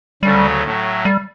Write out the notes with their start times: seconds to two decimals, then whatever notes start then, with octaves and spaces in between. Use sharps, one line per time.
0.23 D2 C#3 F#3 G3 A3 C#4
0.64 A2 F#3 A3
1.05 G3